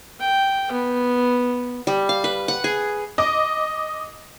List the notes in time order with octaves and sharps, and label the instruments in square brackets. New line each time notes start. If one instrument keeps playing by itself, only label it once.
[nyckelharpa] G5
B3
[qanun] G3
F5
B4
F#5
G#4
[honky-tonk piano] D#5 D6